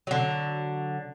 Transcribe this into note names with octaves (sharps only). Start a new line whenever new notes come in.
D3 F#3